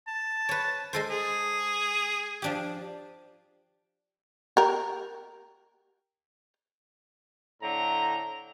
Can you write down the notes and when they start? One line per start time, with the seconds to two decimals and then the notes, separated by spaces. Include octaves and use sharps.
0.07 A5
0.49 B4 C#5
0.93 G#3 A4 C5
1.10 G#4
2.42 F3 D4 G4
4.57 G4 A#4
7.62 A2 D3 A#5